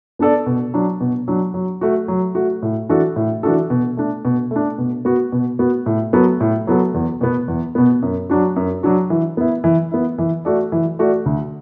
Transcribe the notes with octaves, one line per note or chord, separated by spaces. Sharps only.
B3 D4 A4 D5
B2
F#3 D4
B2
F#3 D4
F#3
A3 F#4
F#3
A3 F#4
A2
E3 D4 F#4 A4
A2
E3 D4 F#4 A4
B2
A3 D4
B2
A3 D4
B2
B3 F#4
B2
B3 F#4
A2
F#3 B3 F#4 A4
A2
F#3 B3 F#4 A4
E2
B2 B3
E2
B2 B3
F#2
F#3 D4 F#4
F#2
F#3 D4 F#4
E3
B3 E4
E3
B3 E4
E3
A3 F#4 A4 D5
E3
A3 F#4 A4 D5
D2